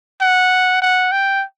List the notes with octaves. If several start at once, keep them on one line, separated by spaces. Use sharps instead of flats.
F#5
F#5
G5